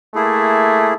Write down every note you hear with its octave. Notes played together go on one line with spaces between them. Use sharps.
A3 A#3 E4 G#4